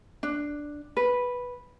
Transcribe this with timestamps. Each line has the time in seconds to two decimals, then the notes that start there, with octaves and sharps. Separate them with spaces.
0.23 D4
0.97 B4